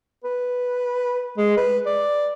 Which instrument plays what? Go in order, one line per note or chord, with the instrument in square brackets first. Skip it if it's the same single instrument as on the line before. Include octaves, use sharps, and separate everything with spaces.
[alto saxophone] B4
G#3
B4
D5